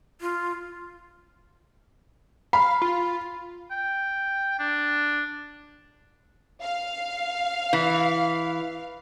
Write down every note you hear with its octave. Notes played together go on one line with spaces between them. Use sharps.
F4
F5 B5
F4
G5
D4
F5
E3